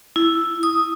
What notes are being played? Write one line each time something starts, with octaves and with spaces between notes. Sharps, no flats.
E4
D#6